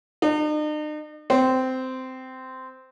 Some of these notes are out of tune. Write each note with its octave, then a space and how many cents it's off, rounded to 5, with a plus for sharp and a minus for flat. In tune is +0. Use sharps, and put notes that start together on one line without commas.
D#4 -45
C4 -15